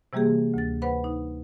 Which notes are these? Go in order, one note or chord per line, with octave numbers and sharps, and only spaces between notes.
C3 E3 G3 A#3 G4 G#4
D2 A6
B4 C5 F#5 B5
D#4